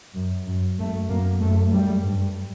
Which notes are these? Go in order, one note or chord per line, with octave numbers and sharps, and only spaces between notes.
F#2
F#2
F#2 A3
F#2 A#3
F#2 A3
F#2 G3
G2